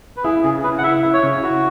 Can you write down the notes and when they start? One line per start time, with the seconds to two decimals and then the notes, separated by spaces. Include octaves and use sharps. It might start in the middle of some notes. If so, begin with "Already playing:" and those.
0.17 B4
0.24 E4 G#4
0.44 C#3 G#4
0.63 C#3 B4
0.78 F#5
0.83 E4 E5
1.03 E4
1.13 C#5
1.23 C#3
1.43 E4 F#4